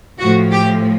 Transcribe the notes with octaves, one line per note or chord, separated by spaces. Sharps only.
A2 F3 F#4
G4